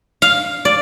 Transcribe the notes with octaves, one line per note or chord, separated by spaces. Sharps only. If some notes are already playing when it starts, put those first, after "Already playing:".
F5
D5